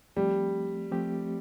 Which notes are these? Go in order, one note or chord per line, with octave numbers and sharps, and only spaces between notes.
F3 G3 A3 C4 G4
F3 A3 C4 G4